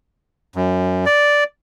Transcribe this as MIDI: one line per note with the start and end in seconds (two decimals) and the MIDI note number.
0.56 1.05 42
1.06 1.44 74